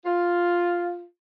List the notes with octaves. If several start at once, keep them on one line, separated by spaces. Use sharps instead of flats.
F4